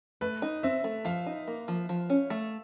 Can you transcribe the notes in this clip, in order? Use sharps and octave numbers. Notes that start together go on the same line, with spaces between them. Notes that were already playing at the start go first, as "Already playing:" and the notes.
A3 B4
D#4
C4 E5
A3
F3 F5
D#4
A#3
F3
F3
C#4
A3